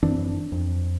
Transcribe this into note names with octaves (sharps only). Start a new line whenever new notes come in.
F#2 E3 C4 D4
F2